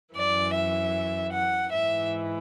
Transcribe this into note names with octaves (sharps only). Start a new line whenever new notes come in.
F#2 E3 D5
E5
F#5
G#2 E3 E5